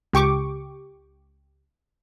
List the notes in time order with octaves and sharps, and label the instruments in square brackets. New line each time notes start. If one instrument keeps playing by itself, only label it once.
[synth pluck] C#2 G4 C#6 D6